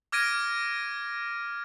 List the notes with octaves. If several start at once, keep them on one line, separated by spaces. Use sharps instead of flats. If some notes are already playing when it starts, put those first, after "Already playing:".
D6 F6 G#6 A#6 D7 D#7